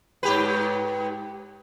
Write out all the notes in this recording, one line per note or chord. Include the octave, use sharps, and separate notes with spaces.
G#2 G4 B4